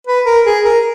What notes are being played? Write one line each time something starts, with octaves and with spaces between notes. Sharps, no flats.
B4
A#4
G#4
A#4